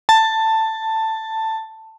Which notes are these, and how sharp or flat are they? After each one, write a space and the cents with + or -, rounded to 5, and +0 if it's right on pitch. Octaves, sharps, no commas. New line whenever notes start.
A5 +10